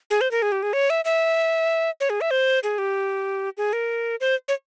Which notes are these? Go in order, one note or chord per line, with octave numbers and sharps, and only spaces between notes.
G#4
C5
A#4
G#4
G4
G#4
C#5
E5
E5
C#5
G#4
E5
C5
G#4
G4
G#4
A#4
C5
C#5